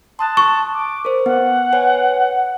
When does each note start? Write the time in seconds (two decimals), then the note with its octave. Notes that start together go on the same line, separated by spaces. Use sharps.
0.19 A5 C6 D#6 F#6
0.37 C#6
0.74 D6
1.05 A#4 C5
1.26 B3 F#5
1.73 B4 C#5 G#5